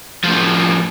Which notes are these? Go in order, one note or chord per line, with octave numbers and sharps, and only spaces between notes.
A2 F3